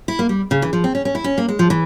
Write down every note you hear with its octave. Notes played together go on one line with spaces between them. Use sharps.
E4
A#3
G3
C#3
E3
F3
C4
C#4
C#4
E4
C#4
A#3
G#3
F3
E3